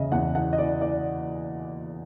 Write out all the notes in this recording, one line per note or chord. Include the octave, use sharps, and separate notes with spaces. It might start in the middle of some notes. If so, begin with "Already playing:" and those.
Already playing: E2 C#3 D#5 E5
E2 F#5
E3 F#5
D#5
E3 D5
E3 D5